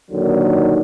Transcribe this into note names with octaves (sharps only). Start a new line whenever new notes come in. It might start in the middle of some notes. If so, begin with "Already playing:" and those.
A#1 D#2 D3 D#3 F#3